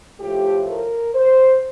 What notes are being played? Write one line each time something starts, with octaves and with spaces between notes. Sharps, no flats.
A2 F3 A3 G4
A#4
C5